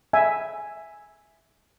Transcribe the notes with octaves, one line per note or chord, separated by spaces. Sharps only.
E5 G#5